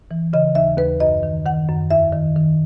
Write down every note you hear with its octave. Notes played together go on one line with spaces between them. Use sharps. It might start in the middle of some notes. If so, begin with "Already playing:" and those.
E3
C#3 D#5
D#2 E5
D#2 B4
F#2 D#5
D#3
D#3 F#5
F#2
E2 E5
D#3
D#3